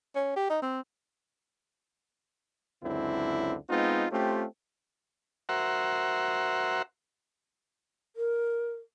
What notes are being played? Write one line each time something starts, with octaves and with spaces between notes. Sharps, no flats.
C#4
G4
D#4
C4
C#2 F#2 D3 C4 E4
G#3 B3 C4 D#4 F4
A3 C4 C#4 F4 G4
F#4 A#4 C5 E5 F#5
A#4